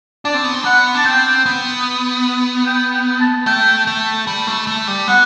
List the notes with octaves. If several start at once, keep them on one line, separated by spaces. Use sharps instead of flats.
D4 D5
C4
B3
C4
B3 F#5
D4 A5
C4 G5
B3
G5
G5
A5
A3 G5
A3
G3
A3
A3
G3
B3 F#5